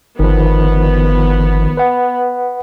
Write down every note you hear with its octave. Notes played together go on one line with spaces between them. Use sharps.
G1 D#3 F3 B3
B4 F#5